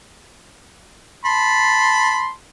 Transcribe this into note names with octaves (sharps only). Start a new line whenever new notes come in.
A5 B5 C6